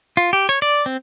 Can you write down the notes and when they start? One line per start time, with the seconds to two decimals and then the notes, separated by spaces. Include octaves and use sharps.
0.17 F4
0.33 G4
0.49 C#5
0.62 D5
0.86 C4